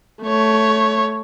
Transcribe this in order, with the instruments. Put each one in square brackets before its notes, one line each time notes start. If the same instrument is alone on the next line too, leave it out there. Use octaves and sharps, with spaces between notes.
[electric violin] A3 C#5